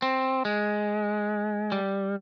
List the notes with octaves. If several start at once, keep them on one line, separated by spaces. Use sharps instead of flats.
C4
G#3
G3